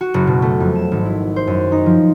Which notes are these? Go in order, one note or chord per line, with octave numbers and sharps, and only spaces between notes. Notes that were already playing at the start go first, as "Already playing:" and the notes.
F#4
F#1
B2
A3
F2
E7
G#1
E4
C5
F#2
D#4
F3